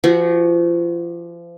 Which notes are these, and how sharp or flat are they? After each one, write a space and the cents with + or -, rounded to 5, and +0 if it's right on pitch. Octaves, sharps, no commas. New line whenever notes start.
F3 -35 F#4 +0